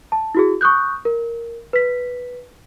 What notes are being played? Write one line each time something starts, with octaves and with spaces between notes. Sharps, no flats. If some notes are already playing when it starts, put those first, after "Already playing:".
A5
E4 F#4 G#4
C#6 D#6 F#6 G6
A#4
B4 B6